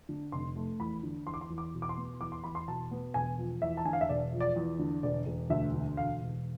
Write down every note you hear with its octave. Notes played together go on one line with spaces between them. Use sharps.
D3
F1 C6
A3
E2 B5
D3
E2 C6
D6
C6
E2
D6
B2
D6
C6
B3
E2 D6
C6
E2 B5
C6
B2 A5
B3
E1 G#5
F3
E2 E5
A5
D3 G#5
F5
E5
E1 D5
F3
D5
E2
D3
E1 D5
E1
D2 E5
D3
E1 F5
E1